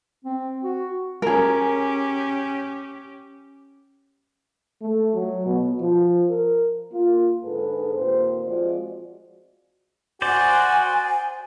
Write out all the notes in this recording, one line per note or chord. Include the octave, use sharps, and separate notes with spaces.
C4
F#4
C#4 G4 G#4 A#4
A3
F#3
B2
F3
A#4
A#3 F4
G#2 D3 G#4 A4 B4
D#2 A#2 C4 C5
F3 G#3 C4 F4 F#4 D5
F#4 C5 D5 G#5